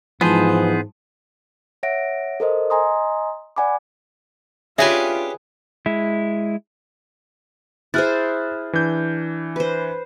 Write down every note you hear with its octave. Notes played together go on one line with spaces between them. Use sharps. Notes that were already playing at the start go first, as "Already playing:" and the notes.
G#2 E3 F3 B3 G#4 C5
C#5 E5 F#5 A#6 D7
A4 A#4 C5 D#5
D#5 G#5 A#5 C6 D#6
D5 F#5 G#5 B5 D6
C#4 D4 F4 G4 G#4 B4 E5 G#5
G#3 E4
E4 G#4 C5 F6 F#6 A6
E3 D4 G6
B4 C5